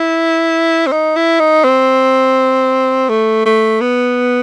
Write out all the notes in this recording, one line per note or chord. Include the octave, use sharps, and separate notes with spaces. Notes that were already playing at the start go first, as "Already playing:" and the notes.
Already playing: E4
C4
D#4
E4
D#4
C4
A3
A3
B3